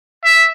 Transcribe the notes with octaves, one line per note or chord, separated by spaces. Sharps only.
E5